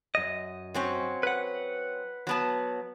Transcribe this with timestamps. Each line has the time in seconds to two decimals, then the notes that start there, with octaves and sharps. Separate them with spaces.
0.15 F#2 D#5
0.74 F#3 C4 C#4
1.23 B4 F#5
2.27 F#3 B3 A5